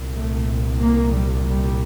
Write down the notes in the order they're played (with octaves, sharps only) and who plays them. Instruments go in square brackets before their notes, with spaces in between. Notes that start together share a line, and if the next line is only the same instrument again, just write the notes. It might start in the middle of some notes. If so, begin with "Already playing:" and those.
Already playing: [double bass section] C2 A#2
A3
A#3
G3
G3